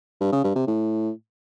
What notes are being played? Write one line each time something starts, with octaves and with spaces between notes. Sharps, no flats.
G2
C#3
G2
C3
A2